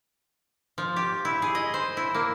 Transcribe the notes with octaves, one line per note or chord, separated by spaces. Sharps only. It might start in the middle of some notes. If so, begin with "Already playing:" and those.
F3
G4
E4
G#4
D#5
C5
E4
A#3